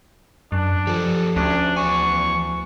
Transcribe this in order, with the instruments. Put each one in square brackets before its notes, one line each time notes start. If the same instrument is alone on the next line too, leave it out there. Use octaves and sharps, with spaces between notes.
[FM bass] F#2 [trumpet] D4
[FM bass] F3 [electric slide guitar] G4 A4 C5
[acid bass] D2 [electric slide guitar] C#4 [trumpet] D4
[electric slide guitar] E2 G#5 [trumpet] C#6